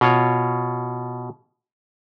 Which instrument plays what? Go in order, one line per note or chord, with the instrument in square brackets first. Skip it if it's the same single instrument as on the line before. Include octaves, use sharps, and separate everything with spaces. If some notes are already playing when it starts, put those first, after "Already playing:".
[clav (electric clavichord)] B2 F4 C#5